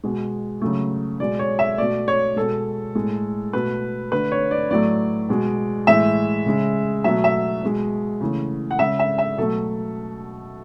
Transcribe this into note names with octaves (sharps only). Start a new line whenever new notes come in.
B2 G#3
C#3 F#3 A3
B2 G#3 D5
C#5
E5
B2 A3 D5
C#5
B2 G#3 A4
A2 G#3
B2 A3 B4
D3 A3 B4
C#5
D5
A2 F#3 A3 D5
B2 G#3
A2 E3 G#3 E5
C#3 G#3
B2 F#3 A3 E5
E5
B2 G#3
C#3 E3 A3
F#5
C#3 G#3 E5
E5
E5
B2 F#3 A3 A4